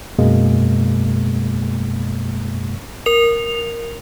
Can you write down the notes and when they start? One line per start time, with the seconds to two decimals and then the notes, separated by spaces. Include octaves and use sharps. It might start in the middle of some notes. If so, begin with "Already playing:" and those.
0.19 F#2 B2 G#3 A#3
3.06 A#4 F7